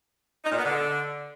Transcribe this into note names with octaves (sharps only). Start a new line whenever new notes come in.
D#4
A#2
B3
D3